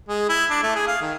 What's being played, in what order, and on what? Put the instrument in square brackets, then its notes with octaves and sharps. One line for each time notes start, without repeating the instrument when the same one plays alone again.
[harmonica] G#3
E4
D4
A3
G#4
F5
D#3